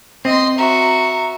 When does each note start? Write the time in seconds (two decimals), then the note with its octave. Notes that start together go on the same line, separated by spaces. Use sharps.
0.25 C4 D#5 C6
0.58 F#4 E5 A#5